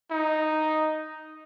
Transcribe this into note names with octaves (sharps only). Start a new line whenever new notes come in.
D#4